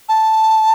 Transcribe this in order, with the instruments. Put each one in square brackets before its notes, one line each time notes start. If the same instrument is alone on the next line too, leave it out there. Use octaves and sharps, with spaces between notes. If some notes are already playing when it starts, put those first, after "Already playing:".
[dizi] A5